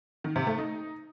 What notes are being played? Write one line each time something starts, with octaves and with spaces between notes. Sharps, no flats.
D#3
C3
A3
D#4